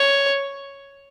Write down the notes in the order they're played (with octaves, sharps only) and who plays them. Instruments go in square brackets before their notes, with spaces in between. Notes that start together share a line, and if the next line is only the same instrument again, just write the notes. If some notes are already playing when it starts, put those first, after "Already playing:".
Already playing: [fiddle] C#5